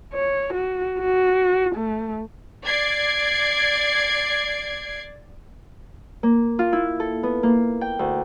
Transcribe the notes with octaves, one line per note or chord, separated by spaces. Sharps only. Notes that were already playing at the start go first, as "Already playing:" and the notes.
C#5
F#4
F#4
A3
D5 G#6 C7 D7
A#3
F4
E4
A4
B3
A#3
G5
D2